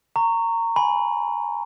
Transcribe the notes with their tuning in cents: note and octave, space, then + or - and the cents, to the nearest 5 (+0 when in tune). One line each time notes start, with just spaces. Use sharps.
A#5 -20 C#6 +0
G#5 +0 B5 +0